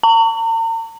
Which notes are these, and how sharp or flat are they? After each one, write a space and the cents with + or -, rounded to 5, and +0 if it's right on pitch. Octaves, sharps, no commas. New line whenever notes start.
A#5 -45